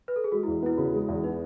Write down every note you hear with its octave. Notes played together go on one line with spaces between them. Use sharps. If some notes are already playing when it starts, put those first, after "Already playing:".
B4
A4
G#4
G#3 F#4
E4
E2
B3 E4
C#3 F#4
G#3
E2
B3 D#4